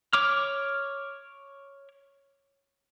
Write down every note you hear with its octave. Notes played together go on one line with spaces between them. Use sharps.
C#5 D6 F6